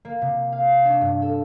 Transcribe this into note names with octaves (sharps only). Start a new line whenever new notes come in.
A#3
C3
F5
D4
G2
A4